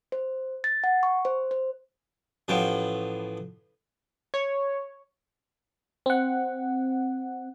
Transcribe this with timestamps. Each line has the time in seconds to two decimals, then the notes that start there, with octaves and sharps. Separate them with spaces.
0.12 C5
0.64 A6
0.84 F#5
1.03 C#6
1.25 C5
1.51 C5
2.48 A1 A2 F3 B3 G5
4.34 C#5
6.06 C4 F#5